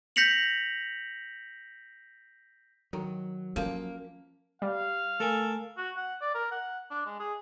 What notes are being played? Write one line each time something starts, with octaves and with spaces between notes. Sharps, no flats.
G6 A#6 B6 C#7 F7 F#7
D#3 F#3
F3 A#3 C#4
G3 F5
A3 A4 A#4 G#5
F#4
F#5
D5
A#4
F#5
D4
G#3
G#4